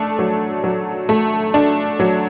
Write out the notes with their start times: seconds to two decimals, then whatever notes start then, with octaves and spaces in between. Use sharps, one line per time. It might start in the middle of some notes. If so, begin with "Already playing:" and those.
Already playing: A3 D4
0.19 F#3
0.64 F#3
1.09 A3
1.54 D4
2.00 F#3